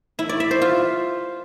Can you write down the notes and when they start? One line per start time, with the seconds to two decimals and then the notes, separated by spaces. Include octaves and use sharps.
0.19 E4
0.29 D5
0.40 E5
0.51 C5
0.62 F4